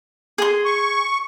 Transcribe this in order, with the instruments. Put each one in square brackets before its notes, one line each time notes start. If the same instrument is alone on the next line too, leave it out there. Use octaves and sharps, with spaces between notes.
[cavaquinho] G#4 C6
[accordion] C#6